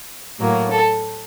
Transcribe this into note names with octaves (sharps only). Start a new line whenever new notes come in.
A2 F#3 A#3
A4